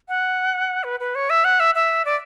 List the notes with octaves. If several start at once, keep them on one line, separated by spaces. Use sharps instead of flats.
F#5
B4
B4
C#5
E5
F#5
E5
E5
D5